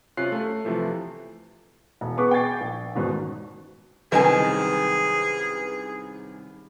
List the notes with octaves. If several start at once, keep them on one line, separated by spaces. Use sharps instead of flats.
F#2 C3 C#4 F4 F#6 C7
A3
C3 E3 F3 A3
E1
B3 G#4 B4 C#6 D6
G5 G#5 C#6 G#6 A6 C7
A#1
E2 G#2 B2 D#3 C#4
C2 F#2 D#3 G#4 B4 D#5 G5 G#5